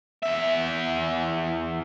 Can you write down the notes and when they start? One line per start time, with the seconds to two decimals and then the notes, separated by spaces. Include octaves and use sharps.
0.23 E2 E5